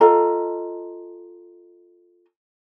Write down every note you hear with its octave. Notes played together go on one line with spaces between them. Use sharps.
F4 A4 D#5 A#5